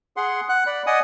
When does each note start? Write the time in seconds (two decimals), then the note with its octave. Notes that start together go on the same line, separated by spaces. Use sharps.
0.17 G#4 F#5 C6
0.49 F#5 F#6
0.66 D5 B5
0.87 D5 D#5 F#5 G#5 D#6